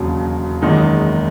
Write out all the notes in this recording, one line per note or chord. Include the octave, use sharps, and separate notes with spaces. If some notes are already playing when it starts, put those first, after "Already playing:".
Already playing: E1 D#2 C#3 F#3
F#1 E2 D#3 G#3 D#4